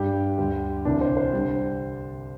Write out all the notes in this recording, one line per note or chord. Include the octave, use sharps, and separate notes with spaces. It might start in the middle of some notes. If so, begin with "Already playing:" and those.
Already playing: G2 G3 G4
D2 D3 G3
C2 C3 E3 D4
C5
C5
D3 G3